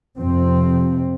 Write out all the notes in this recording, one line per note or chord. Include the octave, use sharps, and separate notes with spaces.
F2 C3 C4